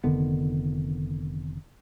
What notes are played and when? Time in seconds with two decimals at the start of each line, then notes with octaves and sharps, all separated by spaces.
0.04 F1 D3 D#3 B3